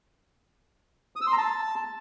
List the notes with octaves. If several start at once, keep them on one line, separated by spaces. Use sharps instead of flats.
D#6
E6
C6
A#5
A5